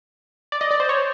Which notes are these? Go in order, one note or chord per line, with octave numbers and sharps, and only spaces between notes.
D5
D#5
D5
C5
C#5